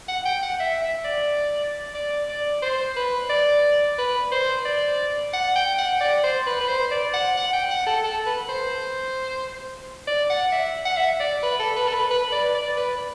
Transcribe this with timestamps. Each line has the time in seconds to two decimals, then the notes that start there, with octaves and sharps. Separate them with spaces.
0.08 F#5
0.25 G5
0.43 F#5
0.60 E5
0.81 E5
1.05 D5
1.94 D5
2.29 D5
2.62 C5
2.96 B4
3.30 D5
3.98 B4
4.32 C5
4.65 D5
5.33 F#5
5.56 G5
5.78 F#5
6.01 D5
6.24 C5
6.46 B4
6.60 B4
6.68 C5
6.91 D5
7.14 F#5
7.36 F#5
7.53 G5
7.71 F#5
7.86 A4
8.04 A4
8.26 B4
8.49 C5
10.07 D5
10.30 F#5
10.52 E5
10.85 F#5
10.97 E5
11.20 D5
11.43 B4
11.59 A4
11.76 B4
11.88 A4
11.93 B4
12.11 B4
12.32 D5
12.54 D5
12.77 B4